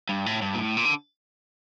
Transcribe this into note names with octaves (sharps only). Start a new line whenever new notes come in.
G2
A2
G2
A#2
A2
A#2
D3